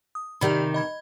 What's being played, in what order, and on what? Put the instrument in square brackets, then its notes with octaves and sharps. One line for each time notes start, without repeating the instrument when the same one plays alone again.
[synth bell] D#6
[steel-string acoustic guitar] C3 D#3 [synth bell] G4 D5 B5
[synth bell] D#5 B5 G#6